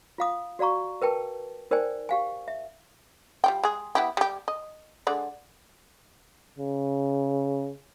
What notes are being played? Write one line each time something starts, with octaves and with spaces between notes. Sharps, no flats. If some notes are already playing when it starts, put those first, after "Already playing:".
F4 F5 D#6
F#4 D5 F5 A#5 C#6
A#4 B4 G5 A5
D#4 A#4 C5 D5 G5 G#5
G4 F5 G#5
E5
G3 F4 G5
G#3 G#4
B3 E4 G4
G3 G4
D#5
D3 G#3 D5
C#3